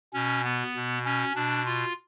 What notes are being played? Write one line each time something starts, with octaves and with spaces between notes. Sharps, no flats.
B2 C#4
B3
B2
C#4
B2 D4
F4